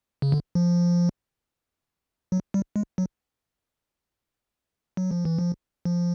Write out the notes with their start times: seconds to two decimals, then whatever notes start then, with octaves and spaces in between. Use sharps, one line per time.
0.22 C#3
0.32 D3
0.55 F3
2.32 F#3
2.54 G3
2.76 G#3
2.98 F#3
4.97 F#3
5.11 F3
5.25 E3
5.39 F3
5.85 F3